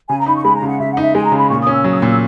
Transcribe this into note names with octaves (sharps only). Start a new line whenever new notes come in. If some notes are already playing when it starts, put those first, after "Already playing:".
C#3 G#5
A#5
D#4 B5
C#6
G#3 B5
A#5
C#3
F#5
C#3 E5
F#5
D#4
E5
G#3 G#5
A#5
C#3
B5
A#2 C#6
D#6
C#4
E6
F#3
D#6
E6
A#2
E6